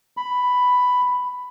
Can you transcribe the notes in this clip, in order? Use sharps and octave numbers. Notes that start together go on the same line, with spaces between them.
B5